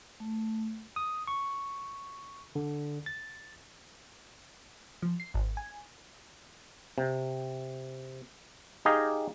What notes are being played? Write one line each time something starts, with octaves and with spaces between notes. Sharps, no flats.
A3
D#6
C#6
D3
A6
F3
C7
G#1
G#5
C3
D#4 G4 G#4 D#5 F5